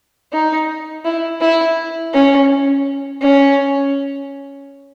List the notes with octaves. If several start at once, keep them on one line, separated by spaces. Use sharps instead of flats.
D#4
E4
E4
C#4
C#4